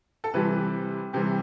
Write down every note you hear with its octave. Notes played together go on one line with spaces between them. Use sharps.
A4
C3 E3 G3 B4
C3 E3 G3 G4